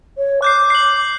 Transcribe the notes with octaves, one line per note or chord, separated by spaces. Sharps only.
C#5
D6 F#6 G6 C7
C7 F#7